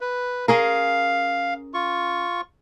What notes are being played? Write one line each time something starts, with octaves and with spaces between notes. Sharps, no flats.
B4
C#4 G#4 A#4 F5
F4 C#6